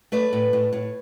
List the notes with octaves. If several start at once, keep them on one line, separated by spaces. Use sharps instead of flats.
A3 B4 D5
A2
A2
A2